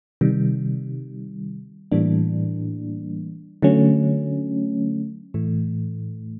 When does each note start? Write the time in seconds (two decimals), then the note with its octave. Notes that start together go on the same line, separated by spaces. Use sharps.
0.21 C3 D#3 G3
1.92 A2 E3 G3 A#3 D4
3.62 D3 F#3 A3 C#4
5.34 A2 E3 A3